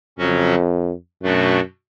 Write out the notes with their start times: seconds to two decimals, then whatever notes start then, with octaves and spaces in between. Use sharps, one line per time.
0.18 F2 C#3 F#3 C#4 F#4
1.23 F#2 B2 A3 D4 F#4